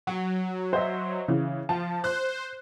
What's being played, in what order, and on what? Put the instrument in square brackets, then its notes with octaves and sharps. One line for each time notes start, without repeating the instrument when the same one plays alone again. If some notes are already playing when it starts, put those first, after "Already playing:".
[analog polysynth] F#3 [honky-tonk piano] F#4
[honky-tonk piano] C5 D#5 E5
C#3 E3
[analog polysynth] F3 [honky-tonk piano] A5
[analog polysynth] C5 [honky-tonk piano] F#6